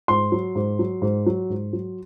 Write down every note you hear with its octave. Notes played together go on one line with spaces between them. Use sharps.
G#2 C6
F#3
G#2
F#3
G#2
F#3
G#2
F#3